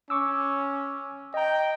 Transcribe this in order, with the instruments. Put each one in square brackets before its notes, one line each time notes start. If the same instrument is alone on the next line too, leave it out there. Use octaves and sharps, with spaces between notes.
[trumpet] C#4 [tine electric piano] C#6 D6 E6
[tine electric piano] D#5 A#5 [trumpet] G5